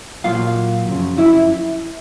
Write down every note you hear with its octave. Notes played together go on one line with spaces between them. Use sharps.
A#2 F#3 A#3 F4 F5
F#2 C#3 F3
E4 E5